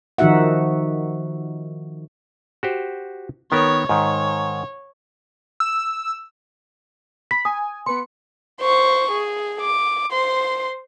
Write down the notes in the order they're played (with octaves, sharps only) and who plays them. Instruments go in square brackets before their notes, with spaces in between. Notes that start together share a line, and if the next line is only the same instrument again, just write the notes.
[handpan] D#3 F3 D#4 F#4 E5 F#5
[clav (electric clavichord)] F#4 G4 C5
[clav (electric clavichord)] D#3 B3 A#4 [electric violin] C#5
[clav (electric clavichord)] G#2 D#3 [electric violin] C#5
[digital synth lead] E6
[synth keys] B5 [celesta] B6
[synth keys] G#5 [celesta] D#6
[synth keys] B3 B4 C#7 [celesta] C6
[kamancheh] C5 C#6
G#4
D6
C5 C6